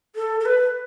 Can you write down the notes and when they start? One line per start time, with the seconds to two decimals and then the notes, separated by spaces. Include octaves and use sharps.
0.16 A4
0.40 A4
0.46 B4